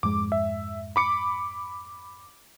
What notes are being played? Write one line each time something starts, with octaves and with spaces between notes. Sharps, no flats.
F2 G#2 G#3 D6
E5
B5 D6 C#7